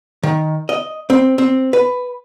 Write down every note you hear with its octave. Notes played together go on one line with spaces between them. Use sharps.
D#3
D#5
C4
C4
B4